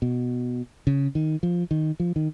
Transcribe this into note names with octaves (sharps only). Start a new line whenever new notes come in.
B2
C#3
D#3
F3
D#3
F3
D#3